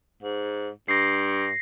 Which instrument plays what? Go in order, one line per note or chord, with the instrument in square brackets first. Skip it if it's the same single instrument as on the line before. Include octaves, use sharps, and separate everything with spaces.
[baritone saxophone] G#2
[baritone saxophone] G2 [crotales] A#6 C7